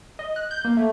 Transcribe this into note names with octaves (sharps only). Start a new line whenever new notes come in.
D#5
F#6
G6
A#3
A3